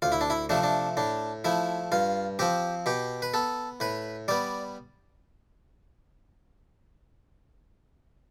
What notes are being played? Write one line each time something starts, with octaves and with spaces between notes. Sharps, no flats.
D2 F4
E4
D4
E4
C3 F3 A3 D4
D4
A2 D4
F3 A3 E4
G2 F4
F3 C4 G4
B2 G4
B4
B3 A4
A2 B4
G3 B3 D5